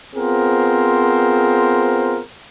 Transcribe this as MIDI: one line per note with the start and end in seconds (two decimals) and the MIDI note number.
0.15 2.22 59
0.15 2.22 60
0.15 2.22 65
0.15 2.22 68
0.15 2.22 70
0.15 2.22 72